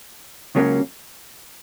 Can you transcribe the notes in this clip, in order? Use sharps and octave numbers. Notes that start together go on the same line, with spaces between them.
C#2 C#3 F#3 A#3 C#4